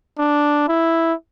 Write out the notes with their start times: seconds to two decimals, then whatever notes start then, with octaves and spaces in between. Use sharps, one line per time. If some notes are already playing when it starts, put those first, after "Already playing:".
0.19 D4
0.69 E4